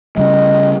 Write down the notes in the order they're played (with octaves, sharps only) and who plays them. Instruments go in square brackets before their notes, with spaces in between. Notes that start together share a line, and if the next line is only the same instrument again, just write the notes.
[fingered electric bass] C#3 G3 [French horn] D#5